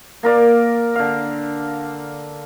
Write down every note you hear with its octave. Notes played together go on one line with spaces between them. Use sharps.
A#3 A#4 D5
D3 F5